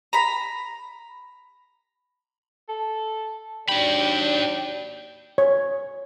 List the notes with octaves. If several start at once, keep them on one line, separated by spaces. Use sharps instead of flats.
A#5 B5
A4
D#2 D4 F#4 D5 G5 B5
C#5